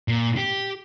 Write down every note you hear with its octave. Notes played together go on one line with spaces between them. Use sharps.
A#2
G4